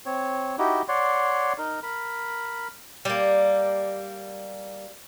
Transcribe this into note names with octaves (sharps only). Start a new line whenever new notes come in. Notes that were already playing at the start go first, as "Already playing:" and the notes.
C4 C#5
D#4 E4 F#4 G4
C#5 D5 F#5 C6
D#4 A#4
A#4 B5
G3 A#3